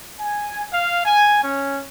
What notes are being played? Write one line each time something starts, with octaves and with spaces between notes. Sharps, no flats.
G#5
F5
G#5
C#4